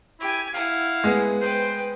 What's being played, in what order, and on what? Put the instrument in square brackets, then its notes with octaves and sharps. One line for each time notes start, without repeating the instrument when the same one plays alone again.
[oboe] E4 [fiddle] G4 G#5
[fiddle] E4 F#5 [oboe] F5
[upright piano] G#3 B3
[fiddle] B4 G5 [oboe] C5